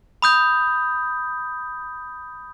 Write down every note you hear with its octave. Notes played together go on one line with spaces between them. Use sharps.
B5 D#6 G6